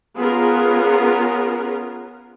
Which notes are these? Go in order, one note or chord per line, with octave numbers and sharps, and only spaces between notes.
B3 C#4 F4 G#4 A#4